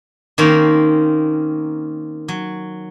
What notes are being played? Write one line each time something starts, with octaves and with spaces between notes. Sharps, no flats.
D#3 A#3 C4 C#4
F#3